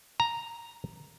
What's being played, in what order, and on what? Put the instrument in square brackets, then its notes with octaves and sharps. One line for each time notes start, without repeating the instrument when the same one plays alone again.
[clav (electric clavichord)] A#5